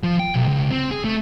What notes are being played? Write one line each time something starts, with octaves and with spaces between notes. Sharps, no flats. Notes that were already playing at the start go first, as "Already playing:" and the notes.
F3
G5
B1
C#2
C4
G#4
A3